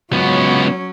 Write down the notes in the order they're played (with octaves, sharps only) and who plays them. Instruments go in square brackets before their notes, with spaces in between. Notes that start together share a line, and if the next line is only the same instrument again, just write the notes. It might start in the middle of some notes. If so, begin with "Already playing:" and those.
[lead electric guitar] C#2 B3 [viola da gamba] F#3 C#4